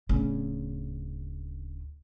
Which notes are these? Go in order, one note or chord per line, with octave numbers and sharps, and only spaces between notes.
D1 C#3